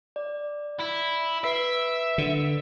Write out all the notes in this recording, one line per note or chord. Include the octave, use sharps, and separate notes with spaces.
D5
E4
B4 E5 C7 D7
D3